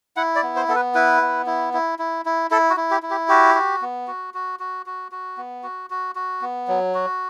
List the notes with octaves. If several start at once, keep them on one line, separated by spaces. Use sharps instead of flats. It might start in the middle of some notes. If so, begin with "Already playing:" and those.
E4 F#5
D5
B3
C5
B3 A4
B4
E4 B4
B3
E4
E4
E4
E4
E4 A4
F#4
E4
G4
E4
G4
F#4 G4
F#4
B3
F#4
F#4
F#4
F#4
F#4
B3
F#4
F#4
F#4
B3
F#3
F#4